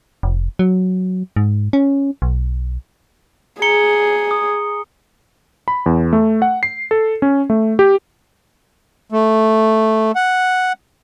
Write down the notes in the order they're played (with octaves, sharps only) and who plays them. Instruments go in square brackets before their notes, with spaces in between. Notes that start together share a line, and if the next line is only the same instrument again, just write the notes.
[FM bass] F1
F#3
G#2
C#4
B1
[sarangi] G#4 [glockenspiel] A#5 C#7 G7
[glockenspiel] D#6
[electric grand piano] B5
E2
A3
F#5
C7
A4
C#4
A3
G4
[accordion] A3
F#5